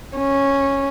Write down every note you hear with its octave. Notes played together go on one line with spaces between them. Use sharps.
C#4